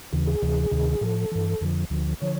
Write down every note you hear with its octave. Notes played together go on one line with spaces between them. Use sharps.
D#2 C#3 E3
G#4
D2 C3 E3
D2 C3 D#3
A2 F3 A4
G2 E3
F2 D3 F3
D2 D3 F3
D3 F3 C#5